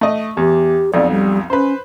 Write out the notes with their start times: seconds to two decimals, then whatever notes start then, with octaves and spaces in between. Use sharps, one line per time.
0.01 A3 D#5
0.37 E2 G4
0.94 B1 F2 D5
1.11 G3
1.50 C#4 B4 C5